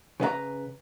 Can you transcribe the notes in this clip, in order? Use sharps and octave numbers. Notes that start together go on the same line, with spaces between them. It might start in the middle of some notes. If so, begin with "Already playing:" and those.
C#3 B4 D#5 A#5